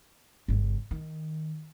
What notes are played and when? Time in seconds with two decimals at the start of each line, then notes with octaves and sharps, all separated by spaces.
0.48 G1 C#3
0.91 D#3